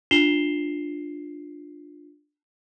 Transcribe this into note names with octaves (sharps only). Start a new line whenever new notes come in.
D4 F4 C7 E7 F7 G7